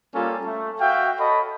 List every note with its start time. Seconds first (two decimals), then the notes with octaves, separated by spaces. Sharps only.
0.15 G3 A#3 C#4 F4 A4
0.45 A3
0.81 F#4 E5 F5 G5
1.19 A4 C#5 D#5 B5